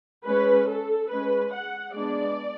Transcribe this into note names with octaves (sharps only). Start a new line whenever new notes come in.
G#3 C#4 B4
A4
G#3 C#4 B4
F#5
G#3 B3 D4 D5